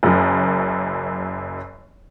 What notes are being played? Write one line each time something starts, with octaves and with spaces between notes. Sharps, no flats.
F#1 F#2